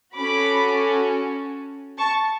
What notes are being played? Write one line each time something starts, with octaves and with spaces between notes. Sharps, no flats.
C#4 F#4 A4 B5 D6
A5 C#6